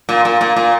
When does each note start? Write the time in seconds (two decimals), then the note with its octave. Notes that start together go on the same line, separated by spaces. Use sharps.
0.09 A#2
0.25 A#2
0.41 A#2
0.56 A#2